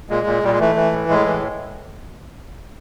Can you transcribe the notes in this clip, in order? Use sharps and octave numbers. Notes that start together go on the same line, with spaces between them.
A#2 G#3
A#2
A#2 G3
G#3
E3 A3
E3
A2
A2 G#3
E3